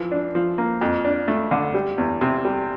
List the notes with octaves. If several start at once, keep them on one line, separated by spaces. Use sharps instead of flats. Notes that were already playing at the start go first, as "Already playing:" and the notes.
Already playing: E3 F3
D4
F3
A#3
F2
D4
A3
D3
G3
E2
C3
G3